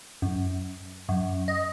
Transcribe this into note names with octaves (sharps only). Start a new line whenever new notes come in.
F#2
F#2
D#5